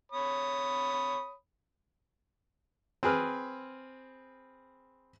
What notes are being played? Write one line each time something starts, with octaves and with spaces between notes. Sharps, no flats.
C#5 B5 D#6
C4 G#4 B4 F6